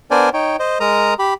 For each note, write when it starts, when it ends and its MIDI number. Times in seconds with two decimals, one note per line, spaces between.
0.11 0.29 59
0.11 0.29 62
0.11 0.29 70
0.11 0.29 72
0.11 0.29 74
0.11 0.29 80
0.33 0.56 63
0.33 0.56 73
0.33 0.56 79
0.59 0.78 72
0.59 0.78 75
0.80 1.14 56
0.80 1.14 70
0.80 1.14 82
0.80 1.14 87
1.19 1.34 67
1.19 1.34 83